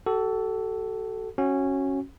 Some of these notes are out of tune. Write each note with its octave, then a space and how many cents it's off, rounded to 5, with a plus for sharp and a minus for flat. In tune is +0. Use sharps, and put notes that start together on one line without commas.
F#4 +45 A4 +0
C#4 -15 F#4 +0